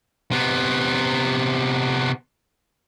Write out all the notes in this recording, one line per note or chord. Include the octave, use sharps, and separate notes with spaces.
C3 B3